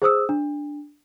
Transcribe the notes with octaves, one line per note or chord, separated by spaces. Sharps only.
G#4 C5 D#6 E6
D4